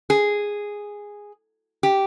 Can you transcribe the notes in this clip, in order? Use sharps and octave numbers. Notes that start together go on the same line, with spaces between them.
G#4
G4